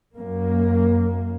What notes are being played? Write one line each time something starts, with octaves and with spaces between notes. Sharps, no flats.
F#2 A#3